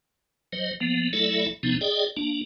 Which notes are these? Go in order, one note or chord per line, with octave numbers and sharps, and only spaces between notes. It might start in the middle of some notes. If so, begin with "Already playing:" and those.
F#3 C5 D#5
F3 A#3 B3
F#3 A3 E4 A4 D5 E5
C3 F3 B3 C#4 D#4
G#4 D5 D#5 G5
A#3 D4